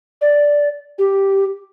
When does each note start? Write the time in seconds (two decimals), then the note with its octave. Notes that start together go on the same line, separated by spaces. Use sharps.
0.21 D5
0.98 G4